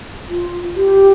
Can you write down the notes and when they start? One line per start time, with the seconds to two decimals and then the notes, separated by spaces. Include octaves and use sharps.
0.28 F4
0.75 G4